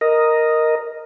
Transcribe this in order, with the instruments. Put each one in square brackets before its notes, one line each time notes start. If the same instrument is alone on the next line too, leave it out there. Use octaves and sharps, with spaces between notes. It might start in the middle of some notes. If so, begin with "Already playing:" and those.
[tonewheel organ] A#4 D#5